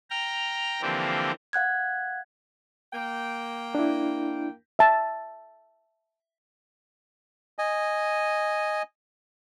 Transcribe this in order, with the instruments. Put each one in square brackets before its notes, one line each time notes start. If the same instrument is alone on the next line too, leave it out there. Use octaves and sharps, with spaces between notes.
[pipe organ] G5 A#5 F6
D3 E3 F3 A#3 C4 G4
[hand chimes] F5 F#5 F#6 G#6
[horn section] A#3 G5
[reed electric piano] D4 E4
[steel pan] E5 A5
[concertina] D#5 G#5